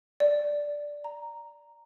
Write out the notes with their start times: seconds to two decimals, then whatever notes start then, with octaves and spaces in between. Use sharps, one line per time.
0.20 D5
1.04 A#5